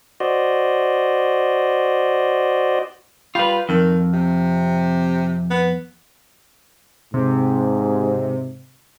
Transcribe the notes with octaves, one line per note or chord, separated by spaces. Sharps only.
F#4 C5 D5 D#5
G3 F4 B4
F2 D#3
C3
B3
G#2 C3